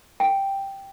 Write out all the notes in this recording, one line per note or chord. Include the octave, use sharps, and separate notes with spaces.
G5